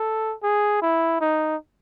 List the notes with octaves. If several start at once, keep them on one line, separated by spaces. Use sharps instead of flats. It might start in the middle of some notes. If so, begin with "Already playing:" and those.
Already playing: A4
G#4
E4
D#4